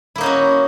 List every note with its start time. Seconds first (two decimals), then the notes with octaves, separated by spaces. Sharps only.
0.16 E4
0.18 A#3
0.21 D#4
0.23 C#4
0.26 F#4